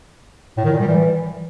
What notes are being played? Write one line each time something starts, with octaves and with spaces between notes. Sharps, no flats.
A2
D#3
A#2
G3
E3